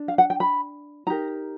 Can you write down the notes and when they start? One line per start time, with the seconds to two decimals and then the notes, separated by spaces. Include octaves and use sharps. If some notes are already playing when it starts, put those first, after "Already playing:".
Already playing: D4
0.08 F5
0.18 F#5
0.30 G5
0.40 B5
1.07 D#4 G4 A#4 A#5